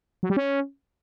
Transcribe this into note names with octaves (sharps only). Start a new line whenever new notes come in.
F#3
G3
C#4